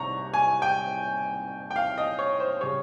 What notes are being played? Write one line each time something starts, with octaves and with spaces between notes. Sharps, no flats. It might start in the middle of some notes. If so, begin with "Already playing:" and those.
Already playing: C2 C3 D#3 A#5 C#6
G#5
G5
G5
F5
D#5
C#5
C5
C#3 G3 C#5